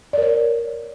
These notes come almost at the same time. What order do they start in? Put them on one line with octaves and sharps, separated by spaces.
D5 A#4 C#5